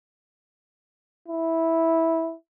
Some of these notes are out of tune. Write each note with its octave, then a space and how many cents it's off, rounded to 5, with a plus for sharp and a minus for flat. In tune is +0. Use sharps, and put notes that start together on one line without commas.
E4 -10